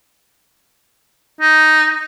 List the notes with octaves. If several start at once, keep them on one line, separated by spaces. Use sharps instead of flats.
D#4